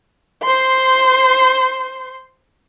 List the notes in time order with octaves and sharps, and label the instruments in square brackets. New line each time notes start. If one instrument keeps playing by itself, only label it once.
[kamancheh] C5 C6